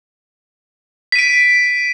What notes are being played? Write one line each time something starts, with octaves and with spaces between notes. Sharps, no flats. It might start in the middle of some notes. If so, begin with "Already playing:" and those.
B6 D7 D#7